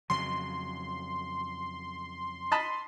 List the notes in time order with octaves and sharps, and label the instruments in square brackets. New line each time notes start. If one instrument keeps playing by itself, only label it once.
[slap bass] F2 C#3 F#3 [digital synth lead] C6
[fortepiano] D#5 A5 B5